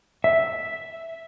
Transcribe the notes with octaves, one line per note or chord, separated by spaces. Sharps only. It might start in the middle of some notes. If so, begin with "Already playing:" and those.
E5